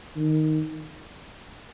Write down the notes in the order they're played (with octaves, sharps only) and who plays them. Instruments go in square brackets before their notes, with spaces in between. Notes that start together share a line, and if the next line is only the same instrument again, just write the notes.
[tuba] D#3